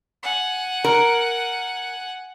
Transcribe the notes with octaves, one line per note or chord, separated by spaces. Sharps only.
F#5 G#5
A#4